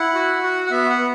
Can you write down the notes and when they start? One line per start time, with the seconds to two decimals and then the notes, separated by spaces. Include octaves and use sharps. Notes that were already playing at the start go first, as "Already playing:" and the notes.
Already playing: E4 F#5
0.15 F#4
0.44 F#4
0.66 F#5
0.71 B3 E5
0.90 F#5
0.99 B3